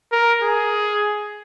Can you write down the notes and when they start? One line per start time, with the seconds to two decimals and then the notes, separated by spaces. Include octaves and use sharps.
0.12 A#4
0.42 G#4